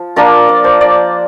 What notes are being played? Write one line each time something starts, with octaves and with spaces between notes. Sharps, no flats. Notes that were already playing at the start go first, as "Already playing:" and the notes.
Already playing: F3
A#3 D4 F4 A#4
D5
C5
D5